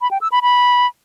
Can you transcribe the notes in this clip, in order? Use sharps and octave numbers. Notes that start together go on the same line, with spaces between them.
B5
G5
E6
B5
B5